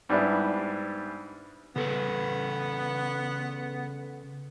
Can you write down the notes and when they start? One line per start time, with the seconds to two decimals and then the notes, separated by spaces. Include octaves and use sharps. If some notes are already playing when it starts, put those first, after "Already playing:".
0.09 G#2 G3 B3 D4 E4
1.76 C#3 B3 A4 B4